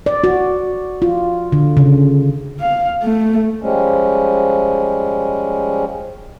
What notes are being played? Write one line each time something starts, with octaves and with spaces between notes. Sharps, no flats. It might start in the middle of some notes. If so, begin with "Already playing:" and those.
D5
F#4
F4
D3
C#3
F5
A3
F3 G3 G#3 C#4